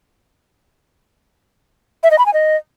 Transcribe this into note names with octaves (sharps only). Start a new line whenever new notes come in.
E5
D#5
B5
G#5
D#5